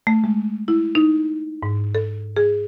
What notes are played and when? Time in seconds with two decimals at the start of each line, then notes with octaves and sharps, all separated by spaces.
0.07 A3
0.24 G#3
0.68 E4
0.95 D#4
1.63 G#2
1.95 A4
2.36 G#4